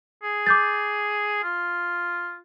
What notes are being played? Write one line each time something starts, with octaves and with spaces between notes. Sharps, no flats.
G#4
D6 G6 A6
F4